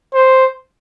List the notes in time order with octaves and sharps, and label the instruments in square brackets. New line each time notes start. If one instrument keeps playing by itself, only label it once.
[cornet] C5